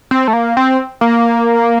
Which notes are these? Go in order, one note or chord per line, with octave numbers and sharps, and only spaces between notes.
C4
A3
A#3
C4
A#3